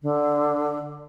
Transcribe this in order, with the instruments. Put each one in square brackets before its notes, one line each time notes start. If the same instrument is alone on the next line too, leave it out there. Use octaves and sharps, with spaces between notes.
[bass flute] D3